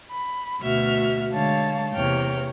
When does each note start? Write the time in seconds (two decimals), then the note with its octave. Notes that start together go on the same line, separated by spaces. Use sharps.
0.12 B5
0.61 D2 B2 F#4 E5 F6
1.33 D3 G#3 C#5 F5 A5
1.94 E2 C3 A#3 C#5 G5 F6